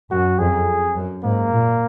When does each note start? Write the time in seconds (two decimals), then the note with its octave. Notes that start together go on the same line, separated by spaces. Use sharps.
0.11 F#2 F#4
0.38 F2 G#4
0.96 F#2
1.23 G#2 A#3
1.51 A#2